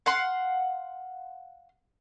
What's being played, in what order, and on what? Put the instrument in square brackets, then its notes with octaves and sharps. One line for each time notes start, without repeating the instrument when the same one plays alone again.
[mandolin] F5 F#5 C6